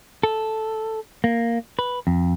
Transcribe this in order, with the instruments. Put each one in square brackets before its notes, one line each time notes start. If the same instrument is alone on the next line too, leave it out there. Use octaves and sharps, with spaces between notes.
[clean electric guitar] A4
A#3
B4
F2